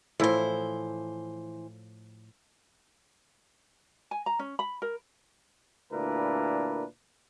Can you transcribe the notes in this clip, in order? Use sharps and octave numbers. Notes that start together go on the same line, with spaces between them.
A2 E3 F3 E4 C5
G#5
A#5
C#4
B5
A#4
D2 A#2 D4 E4 A#4 B4